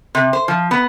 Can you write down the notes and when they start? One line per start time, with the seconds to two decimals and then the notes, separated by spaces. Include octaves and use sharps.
0.15 C3
0.33 C5
0.48 F3
0.71 B3